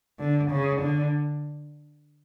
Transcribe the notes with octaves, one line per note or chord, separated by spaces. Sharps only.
D3
C#3
D3